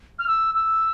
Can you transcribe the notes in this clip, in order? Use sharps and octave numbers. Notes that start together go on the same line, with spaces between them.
F6
E6
E6